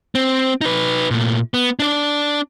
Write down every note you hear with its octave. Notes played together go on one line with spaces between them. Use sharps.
C4
D#4 B4
A#2 A3
B3
D4 D5